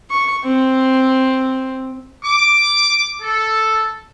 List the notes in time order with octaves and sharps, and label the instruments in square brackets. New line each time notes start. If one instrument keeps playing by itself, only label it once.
[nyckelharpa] C#6
C4
[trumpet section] D6
A4